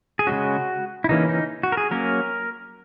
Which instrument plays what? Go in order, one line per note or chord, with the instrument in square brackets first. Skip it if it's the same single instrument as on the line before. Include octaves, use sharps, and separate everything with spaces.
[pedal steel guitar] G#4
C#3 G#3 C#4 F#4
E4
C#3 E3 A#3 C#4 D#4
D#4
F#4
A#4
G#4
F#3 A#3 C#4 A#4